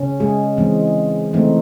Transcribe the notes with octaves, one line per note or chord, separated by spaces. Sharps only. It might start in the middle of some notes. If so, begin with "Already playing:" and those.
Already playing: C#3 C#4
G#3 G#4
E3 G#3 C4
E3 A3 C4 D#4